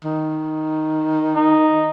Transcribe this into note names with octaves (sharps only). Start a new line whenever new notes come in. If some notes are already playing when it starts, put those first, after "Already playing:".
D#3
D#4